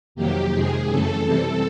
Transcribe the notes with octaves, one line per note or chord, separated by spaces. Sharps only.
F2 C3 D#3 F#3 A#3 G4
F2 C3 D#3 G#3 G#4
F#2 C#3 E3 A3 A4
C3 E3 G3 C4